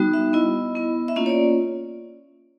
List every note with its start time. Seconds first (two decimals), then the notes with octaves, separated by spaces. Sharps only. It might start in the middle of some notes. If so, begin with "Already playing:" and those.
Already playing: G3 B3 D#4 F#4
0.14 E5
0.33 B3 E4 D#5
0.75 B3 E4
1.08 E5
1.16 A#3 C#4 F4 D#5
1.26 C#5
1.29 D5